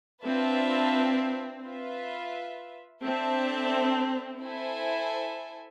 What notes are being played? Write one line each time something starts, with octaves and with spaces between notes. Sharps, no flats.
C4 D4 F4 B4 E5 A5
F4 B4 E5
C4 D4 A4 E5 A5
E4 A4 C5 E5 G#5